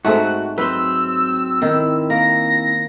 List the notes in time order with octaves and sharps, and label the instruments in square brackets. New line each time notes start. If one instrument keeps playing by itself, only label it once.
[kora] G#2 A3 C4 [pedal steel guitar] F#4 [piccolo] F#6
[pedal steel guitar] F#3 C4 C6 [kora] B4 [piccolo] E6
[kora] D#3 [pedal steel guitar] C4 E4
[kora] A#3 [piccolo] A#6